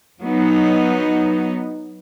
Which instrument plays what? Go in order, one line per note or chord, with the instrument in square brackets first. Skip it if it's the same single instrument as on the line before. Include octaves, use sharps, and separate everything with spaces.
[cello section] F#3 B3 D#4